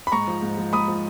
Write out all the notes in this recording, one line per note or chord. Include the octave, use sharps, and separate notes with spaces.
B5
G#2 A#5 C#6
F3
G#2
F3
G#2 B5 D#6
F3